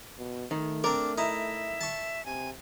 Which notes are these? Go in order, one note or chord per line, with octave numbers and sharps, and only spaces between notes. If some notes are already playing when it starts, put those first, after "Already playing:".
B2
D#3 A3
C4 D4 A#4 D5
D#4 E4 E5
A5 C#6
C3 G#5